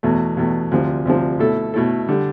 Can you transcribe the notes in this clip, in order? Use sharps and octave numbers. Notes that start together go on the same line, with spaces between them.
E2 B2 A3
E2 B2 A3
D2 C3 F3
D2 C3 F3
B2 A3 E4 A4
B2 A3 E4 A4
D3 G3